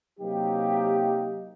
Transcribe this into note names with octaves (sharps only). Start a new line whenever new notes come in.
C3 F#3 A#3 D#4 G4